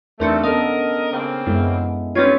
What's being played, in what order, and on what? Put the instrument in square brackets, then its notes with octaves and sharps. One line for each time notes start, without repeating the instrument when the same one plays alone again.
[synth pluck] E2 C4 C#7 [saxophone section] D#3 G3 A3 [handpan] D4 A#4
[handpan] B3 C#4 A4 [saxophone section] A#4 D#5 [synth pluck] F5 D#6
[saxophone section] C#3 A#3 C4
[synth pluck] F#2 [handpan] G#3 B3 E4
[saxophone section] G3 B4 C#5 [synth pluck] C4 C#4 F4 [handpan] D#4